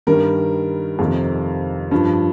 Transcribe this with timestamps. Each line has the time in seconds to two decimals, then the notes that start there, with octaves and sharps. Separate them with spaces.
0.07 G2 D#3 G3 A#4
0.99 F2 C3 D#3
1.91 G2 F3